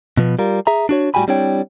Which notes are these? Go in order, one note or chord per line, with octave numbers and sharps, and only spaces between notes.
B2 F3 B3
G3 F4 A#4
G#4 E5 A#5
D4 F#4 C#5
A2 G3 F#4 G5 G#5 B5
G3 C4 D4 E4 C#5 G5